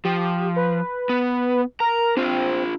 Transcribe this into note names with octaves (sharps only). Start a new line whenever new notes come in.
F3 G4
B4
B3
A#4 A#5
C4 D4 F4